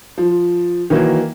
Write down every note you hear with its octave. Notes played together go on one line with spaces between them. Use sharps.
F3
D#3 E3 F#3 A#3